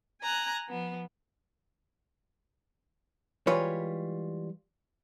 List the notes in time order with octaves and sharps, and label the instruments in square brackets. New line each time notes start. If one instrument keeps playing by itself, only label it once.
[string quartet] G#5 A#5 F#6
F3 B3
[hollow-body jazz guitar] E3 G3 G#3 F4 B4 C#5